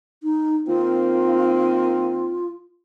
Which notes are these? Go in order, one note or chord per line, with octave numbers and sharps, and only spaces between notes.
D#4
D#3 A#3 C4 F4